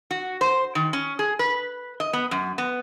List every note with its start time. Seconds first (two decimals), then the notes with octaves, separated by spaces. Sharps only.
0.11 F#4
0.41 C5
0.75 D#3
0.93 C#4
1.19 G#4
1.39 B4
2.00 D#5
2.13 B3
2.31 F#2
2.58 B3